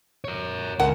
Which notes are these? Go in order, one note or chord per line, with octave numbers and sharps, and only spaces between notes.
A#4 C#5
C#2 C#3 A#4 F#5 G#5